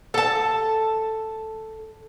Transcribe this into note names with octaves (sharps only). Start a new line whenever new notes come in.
A4 A5